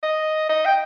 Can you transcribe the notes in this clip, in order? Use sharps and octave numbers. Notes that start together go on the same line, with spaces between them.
D#5
D#5
G5